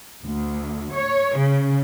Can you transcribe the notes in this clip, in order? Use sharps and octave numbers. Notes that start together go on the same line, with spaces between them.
D2
C#5
C#3